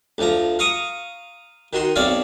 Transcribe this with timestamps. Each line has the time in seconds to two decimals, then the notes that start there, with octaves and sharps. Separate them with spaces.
0.18 D2 F3 A#5
0.59 F5 A#5 C#6 D#6
1.73 D#3 F#4 C6
1.96 B1 C4 C#5 D5 E5 F5